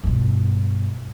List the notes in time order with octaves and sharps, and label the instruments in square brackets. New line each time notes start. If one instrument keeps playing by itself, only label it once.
[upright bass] G2 B2